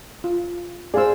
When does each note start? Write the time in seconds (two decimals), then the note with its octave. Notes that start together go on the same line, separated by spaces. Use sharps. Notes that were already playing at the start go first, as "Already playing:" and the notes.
0.24 F4
0.94 G#4 C5 D5 F5 E6